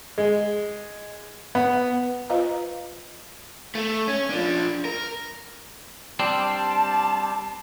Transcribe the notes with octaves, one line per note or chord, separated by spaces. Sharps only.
G#3
B3
F4 B4 C5 D#5 F5 A#5
A3
C#4
F3 D4
A#4
G3 C4 D4 A5